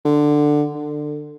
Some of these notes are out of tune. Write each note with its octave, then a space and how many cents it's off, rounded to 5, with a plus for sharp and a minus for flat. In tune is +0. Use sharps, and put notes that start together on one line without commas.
D3 +10
D3 +25